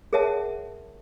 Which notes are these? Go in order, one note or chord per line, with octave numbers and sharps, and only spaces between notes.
G#4 A#4 C#5 E5 F#5 A5